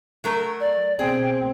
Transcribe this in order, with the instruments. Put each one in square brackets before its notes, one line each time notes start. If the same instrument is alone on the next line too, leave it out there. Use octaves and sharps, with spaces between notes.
[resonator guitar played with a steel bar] F#3 A3 A#4
[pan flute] D5
[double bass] B2 C4 [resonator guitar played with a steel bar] G#4 [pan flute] G5